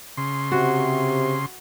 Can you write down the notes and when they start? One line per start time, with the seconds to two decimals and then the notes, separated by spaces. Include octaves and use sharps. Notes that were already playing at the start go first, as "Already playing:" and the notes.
0.17 C#3 C6
0.52 C3 F#4